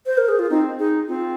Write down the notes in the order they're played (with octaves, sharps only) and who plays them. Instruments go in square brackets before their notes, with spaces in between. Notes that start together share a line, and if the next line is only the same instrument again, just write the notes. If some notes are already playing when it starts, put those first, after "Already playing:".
[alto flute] C5
A#4
G#4
F4
[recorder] C4 [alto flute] D#4
[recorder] D#4 [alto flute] G#4
[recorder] C4 [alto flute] F4